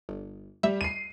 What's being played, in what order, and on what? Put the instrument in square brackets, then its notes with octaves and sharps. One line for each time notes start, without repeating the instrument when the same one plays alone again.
[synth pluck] G1
[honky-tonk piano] G3 [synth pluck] E5
[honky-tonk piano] C7 D#7